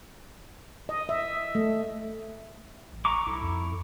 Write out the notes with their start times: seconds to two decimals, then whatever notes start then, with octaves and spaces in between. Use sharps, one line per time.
0.89 D#5
1.09 E5
1.55 A3
2.93 A1
3.05 A#5 C#6 D6
3.27 C2 E4 A4
3.42 F2